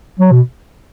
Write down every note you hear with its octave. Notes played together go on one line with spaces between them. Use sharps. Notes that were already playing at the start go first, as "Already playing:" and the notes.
F#3
B2